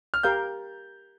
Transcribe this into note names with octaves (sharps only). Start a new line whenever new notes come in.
F6
G4 A#4 F5 G6